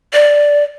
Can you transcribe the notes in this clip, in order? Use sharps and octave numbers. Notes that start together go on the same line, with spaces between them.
D5